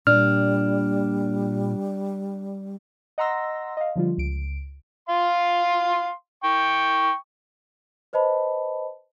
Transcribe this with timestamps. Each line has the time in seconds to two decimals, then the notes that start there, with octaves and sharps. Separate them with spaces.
0.07 A#2 G3 D4 F6
3.18 D#5 F#5 A#5 C6 E6 A#6
3.77 D#5 F5
3.96 D3 F3 G3 F4
4.18 C#2 D7
5.09 F5 C6
6.44 G5 C#6
8.13 B4 C5 D#5 A5 B5